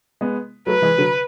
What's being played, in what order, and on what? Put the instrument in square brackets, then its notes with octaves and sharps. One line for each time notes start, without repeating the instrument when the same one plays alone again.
[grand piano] G#3 B3
[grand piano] F#3 A3 [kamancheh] B4
[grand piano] E3 G#3
D3 F#3